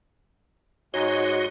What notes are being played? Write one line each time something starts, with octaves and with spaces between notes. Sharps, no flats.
G#2 F#4 C#5 D#5 C6